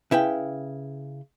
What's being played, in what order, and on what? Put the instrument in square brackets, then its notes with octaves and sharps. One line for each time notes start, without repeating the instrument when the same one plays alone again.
[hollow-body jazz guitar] C#3 E4 B4 G5